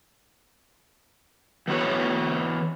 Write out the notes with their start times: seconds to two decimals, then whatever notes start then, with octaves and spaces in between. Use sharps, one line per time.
1.68 E3 B3 F#4 C#5